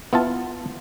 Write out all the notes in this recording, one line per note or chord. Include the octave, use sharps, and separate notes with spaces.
B3 E4 F4 A5